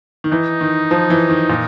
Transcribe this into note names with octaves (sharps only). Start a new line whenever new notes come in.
D#3
E3 D#4
D#3
F3
E3
D#3
A#2